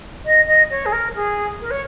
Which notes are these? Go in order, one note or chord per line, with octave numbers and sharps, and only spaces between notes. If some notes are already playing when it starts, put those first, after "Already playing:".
D#5
D#5
C#5
G#4
A#4
G#4
A#4
C#5